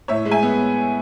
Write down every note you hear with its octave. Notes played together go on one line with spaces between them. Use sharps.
A2 C#5 E5
G#3
E5 G#5
B3